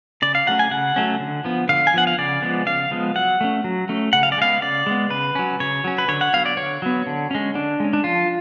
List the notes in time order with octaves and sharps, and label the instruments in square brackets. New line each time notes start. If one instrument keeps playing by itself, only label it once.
[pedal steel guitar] C#3 D5
F5
F#3 A3 C#4 F#5
G#5
C#3 F#5
F#3 A3 C#4
D3
F3 B3
D3 F5
G#5
F3 B3 F#5
F5
C#3 D5
F3 G#3 B3
C#3 F5
F3 G#3 B3
F#3 F#5
A3 C#4
F#3
A3 C#4
C#3 F#5
F5
D5
G#3 B3 F5
C#3 D5
G#3 B3
C#3 B4
F#3 C#4
C#3 C#5
F#3 C#4
B4
D3 C#5
F#5
F#3 B3 F5
D5
D3 C#5
F#3 B3
D3
G#3 C#4
D3 D4
G#3 C#4
D4
F3 F4